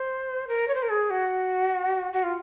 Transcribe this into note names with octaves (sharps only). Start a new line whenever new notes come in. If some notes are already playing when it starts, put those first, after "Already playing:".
Already playing: C5
A#4
C#5
C5
A#4
G#4
F#4
F#4
F4